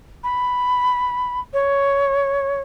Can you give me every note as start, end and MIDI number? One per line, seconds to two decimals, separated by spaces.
0.24 1.40 83
1.53 2.60 73